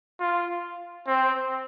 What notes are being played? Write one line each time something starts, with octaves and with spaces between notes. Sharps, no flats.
F4
C4